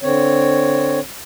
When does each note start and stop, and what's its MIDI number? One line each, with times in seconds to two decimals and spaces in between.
0.03 0.99 50
0.03 0.99 60
0.03 0.99 73